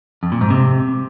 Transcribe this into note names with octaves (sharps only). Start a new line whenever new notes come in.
F2
A#2
G#2
C3